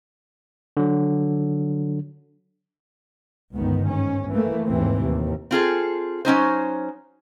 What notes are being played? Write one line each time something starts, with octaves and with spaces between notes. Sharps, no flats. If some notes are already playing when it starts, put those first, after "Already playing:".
D3 F#3
G1 C#2 D#3 B3
G#2 C#4
E3 A3 A#3
D#2 G#2 C3 E3 C4
D#2 A2
C4 F4 G#4 A4
F#3 C#4 D#4 C5